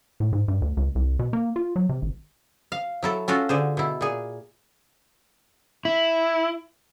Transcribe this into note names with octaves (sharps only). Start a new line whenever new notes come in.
A2
G#2
G2
D2
C#2
C2
B2
A#3
F4
F#3
C3
G#1
F5
F#3 E4 A4
C#4 F4 F#4 A4
D3 G#4 C5
B2 E4
A#2 G#4
E4